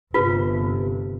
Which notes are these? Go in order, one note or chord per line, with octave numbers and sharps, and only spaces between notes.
G1 C3 F4 B4